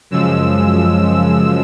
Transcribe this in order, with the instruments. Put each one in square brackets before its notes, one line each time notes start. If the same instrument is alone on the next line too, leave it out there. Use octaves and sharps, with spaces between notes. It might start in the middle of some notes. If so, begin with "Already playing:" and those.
[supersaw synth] F#2 C#3 F3 G#3 E6